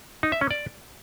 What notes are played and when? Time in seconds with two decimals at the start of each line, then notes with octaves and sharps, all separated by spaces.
0.23 D#4
0.32 E5
0.41 C#4
0.51 D5